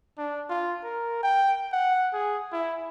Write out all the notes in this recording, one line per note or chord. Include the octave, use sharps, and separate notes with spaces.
D4
F4
A#4
G5
F#5
G#4
E4